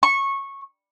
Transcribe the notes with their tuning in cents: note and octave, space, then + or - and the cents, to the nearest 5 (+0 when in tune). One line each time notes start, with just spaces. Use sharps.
C#6 -15